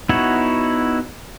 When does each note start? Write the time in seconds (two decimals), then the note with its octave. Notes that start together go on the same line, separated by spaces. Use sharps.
0.09 B3 D#4 E4 F#4 C#5